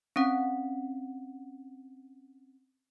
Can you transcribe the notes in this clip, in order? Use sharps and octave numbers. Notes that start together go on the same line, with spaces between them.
C4 C#4 F#5